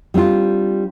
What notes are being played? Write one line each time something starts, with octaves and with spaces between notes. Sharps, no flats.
G3 C4 D4 F4